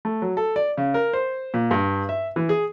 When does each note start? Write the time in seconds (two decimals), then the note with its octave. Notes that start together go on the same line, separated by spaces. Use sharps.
0.05 A3
0.22 F#3
0.37 A4
0.56 D5
0.77 C#3
0.94 A#4
1.13 C5
1.54 A#2
1.71 G2
2.09 E5
2.36 E3
2.49 G#4